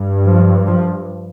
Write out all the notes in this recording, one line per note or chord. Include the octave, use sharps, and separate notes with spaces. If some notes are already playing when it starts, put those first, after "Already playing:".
Already playing: G2
F3
F3